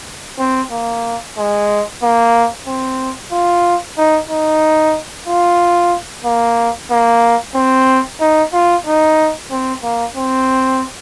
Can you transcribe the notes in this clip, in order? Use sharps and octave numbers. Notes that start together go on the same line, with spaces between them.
C4
A#3
G#3
A#3
C4
F4
D#4
D#4
F4
A#3
A#3
C4
D#4
F4
D#4
C4
A#3
C4